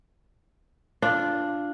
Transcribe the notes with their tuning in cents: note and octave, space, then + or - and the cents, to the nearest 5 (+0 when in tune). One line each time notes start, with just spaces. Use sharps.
D4 +0 F4 -10